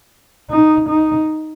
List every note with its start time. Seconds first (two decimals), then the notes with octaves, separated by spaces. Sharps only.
0.50 D#4
0.89 D#4